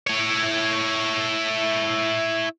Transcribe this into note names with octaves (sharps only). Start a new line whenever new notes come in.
E4 C#5